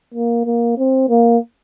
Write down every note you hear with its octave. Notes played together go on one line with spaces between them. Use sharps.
A#3
A#3
C4
A#3